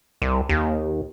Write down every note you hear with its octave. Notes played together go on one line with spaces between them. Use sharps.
C2
D#2